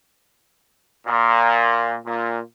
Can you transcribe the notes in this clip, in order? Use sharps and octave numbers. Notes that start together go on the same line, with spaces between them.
A#2
A#2